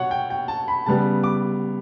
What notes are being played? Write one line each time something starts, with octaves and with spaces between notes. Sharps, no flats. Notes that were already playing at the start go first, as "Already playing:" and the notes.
Already playing: B2 F#3 C#5 F#5
G5
G5
A5
B5
C#3 G3 B3 A5
D6